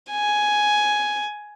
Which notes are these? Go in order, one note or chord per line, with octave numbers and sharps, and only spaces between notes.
G#5